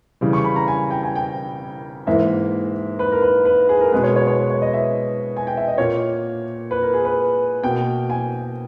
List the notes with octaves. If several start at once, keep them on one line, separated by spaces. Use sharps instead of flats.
C#3 E3 G3
C#6
B5
A#5
G#5
G5
G#5
G5
G#2 E3 A#3 E5
B4
A#4
B4
B4
G#4
A#4
B2 G#3 B3 B4
C#5
C#5
C#5
B4
C#5
D#5
E5
G#5
G5
E5
D#5
A#2 A#3 C#5
B4
A#4
G#4
B4
B2 A#3 G5
G#5